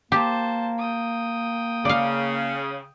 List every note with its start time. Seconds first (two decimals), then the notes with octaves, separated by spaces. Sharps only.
0.12 A#3 G4 C5 A5
0.78 G5 D#6
1.85 C#3 D5 F5